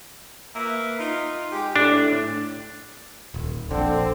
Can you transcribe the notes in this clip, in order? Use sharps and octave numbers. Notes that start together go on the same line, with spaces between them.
A#3 B4 E5
D#4 F4
G#3 G4
A2 D4
D#1
A#1 D3 C4